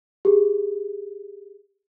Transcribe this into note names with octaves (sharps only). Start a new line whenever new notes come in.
G4 G#4